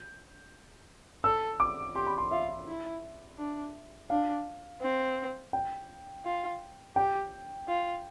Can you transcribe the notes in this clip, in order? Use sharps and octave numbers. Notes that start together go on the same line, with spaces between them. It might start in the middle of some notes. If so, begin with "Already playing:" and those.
Already playing: G6
A4 E6
D6
G4 C6
B5
C6
F4 E5
E4
D4
D4 F5
C4
G5
F4
G4 G5
F4